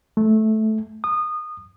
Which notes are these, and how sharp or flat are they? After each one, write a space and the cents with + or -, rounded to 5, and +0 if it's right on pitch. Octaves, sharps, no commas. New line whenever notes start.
A3 -10
D#6 -20